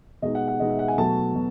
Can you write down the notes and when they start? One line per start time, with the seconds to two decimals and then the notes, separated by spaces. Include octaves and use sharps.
0.22 B2 G#3 D#4 D#5
0.35 F#5
0.48 F#5
0.60 B2 G#3 D#4 D#5
0.70 E5
0.79 F#5
0.88 G#5
0.98 B2 F#3 A3 A5
1.35 B2